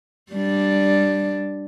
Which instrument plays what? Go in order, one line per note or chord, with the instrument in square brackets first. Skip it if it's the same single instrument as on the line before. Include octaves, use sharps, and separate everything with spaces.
[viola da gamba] G3 D4